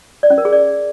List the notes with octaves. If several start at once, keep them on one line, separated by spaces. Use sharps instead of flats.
D5
C#4
A#4
G#4
D5